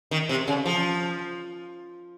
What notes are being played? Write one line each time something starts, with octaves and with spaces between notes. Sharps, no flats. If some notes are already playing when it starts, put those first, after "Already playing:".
D#3
C3
C#3
F3